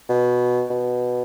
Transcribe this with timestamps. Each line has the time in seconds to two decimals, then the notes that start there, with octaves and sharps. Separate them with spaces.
0.09 B2
0.70 B2